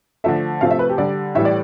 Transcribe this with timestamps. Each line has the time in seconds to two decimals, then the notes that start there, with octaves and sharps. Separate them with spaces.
0.24 D3 F3 A3 E5
0.61 C3 F3 A3 F5
0.71 E5
0.79 B4
0.89 G4
0.98 D3 G3 D5
1.35 A2 E3 G3 E5
1.45 D5